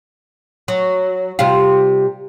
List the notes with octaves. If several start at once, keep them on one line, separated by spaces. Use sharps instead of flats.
F#3
C3 G3 F4